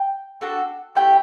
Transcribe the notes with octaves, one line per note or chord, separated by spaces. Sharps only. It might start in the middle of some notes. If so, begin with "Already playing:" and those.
Already playing: G5
D4 F#4 A4
A3 E4 G4 G5